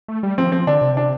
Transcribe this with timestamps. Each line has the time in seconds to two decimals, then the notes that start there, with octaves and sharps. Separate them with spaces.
0.08 A3
0.23 G3
0.38 F3 C4
0.52 F3 C4
0.67 D3 D4
0.81 C3
0.97 D4